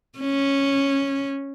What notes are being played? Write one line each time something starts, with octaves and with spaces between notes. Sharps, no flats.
C#4